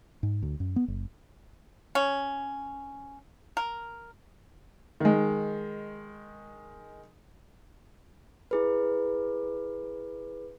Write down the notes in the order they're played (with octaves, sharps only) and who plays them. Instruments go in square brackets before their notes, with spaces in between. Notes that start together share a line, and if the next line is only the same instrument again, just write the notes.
[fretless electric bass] G#2
D2
F#2
B3
F#1
[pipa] C#4
A#4
[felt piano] D#3 G#3
[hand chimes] E4 G#4 B4